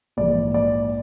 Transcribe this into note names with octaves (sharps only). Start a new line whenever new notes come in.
A#1 G#2 E3 D5
D5